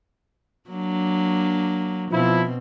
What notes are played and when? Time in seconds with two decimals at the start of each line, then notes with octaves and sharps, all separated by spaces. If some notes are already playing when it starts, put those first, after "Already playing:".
0.69 F#3 A#3 D4
2.11 B2 F3 C4 E4